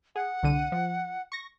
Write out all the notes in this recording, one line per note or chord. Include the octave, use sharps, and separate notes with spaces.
G#4 F#5
C2 D3 D#7
F3
C#6 A#6